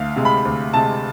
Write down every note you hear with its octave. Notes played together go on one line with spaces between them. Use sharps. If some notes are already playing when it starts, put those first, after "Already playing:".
Already playing: D2 F5
C3 G#3
B5
D2
C3 G#3 A5